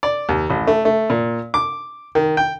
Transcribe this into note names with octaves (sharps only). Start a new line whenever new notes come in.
D5
D#2
A1
A3
A3
A#2
D6
D#3
G5